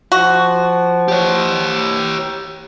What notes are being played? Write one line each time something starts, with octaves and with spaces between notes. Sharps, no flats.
F3 F#4
G4 C#5